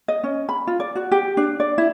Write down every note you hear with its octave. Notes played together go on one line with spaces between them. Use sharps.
D#5
C#4
B5
F4
D5
F#4
G4
D4
D5
E4